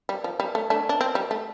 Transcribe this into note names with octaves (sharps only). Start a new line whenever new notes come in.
G3
F3
G3
A3
A3 D4
D4
C4
G3
A3